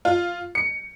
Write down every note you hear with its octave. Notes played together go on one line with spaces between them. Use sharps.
F4
C#7